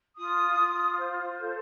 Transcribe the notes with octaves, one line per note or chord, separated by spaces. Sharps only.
F4 D#6
F4
C5
A4